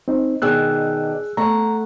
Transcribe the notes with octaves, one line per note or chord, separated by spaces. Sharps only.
C4 D#4
B2 D#3 D4 G#4 E6 F#6
A3 F#5 A#5